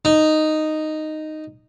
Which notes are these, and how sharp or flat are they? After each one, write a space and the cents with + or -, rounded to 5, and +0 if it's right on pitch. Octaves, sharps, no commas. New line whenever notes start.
D#4 -5